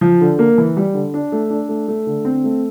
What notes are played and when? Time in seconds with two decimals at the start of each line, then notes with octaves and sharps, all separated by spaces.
0.01 F3
0.21 D3
0.39 A#3
0.58 E3
0.77 G3
0.94 D3
1.14 D4
1.32 A3
1.50 D4
1.69 A3
1.88 A3
2.07 D3
2.25 C4
2.44 A3